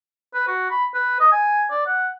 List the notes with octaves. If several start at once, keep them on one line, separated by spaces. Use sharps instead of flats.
B4
F#4
B5
B4
D#5
G#5
D5
F#5